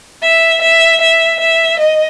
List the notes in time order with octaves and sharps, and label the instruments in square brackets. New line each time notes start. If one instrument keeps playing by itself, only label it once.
[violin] E5
E5
E5
E5
D#5